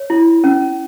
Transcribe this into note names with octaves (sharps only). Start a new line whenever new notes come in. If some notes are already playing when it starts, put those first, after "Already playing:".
Already playing: C#5
E4
C#4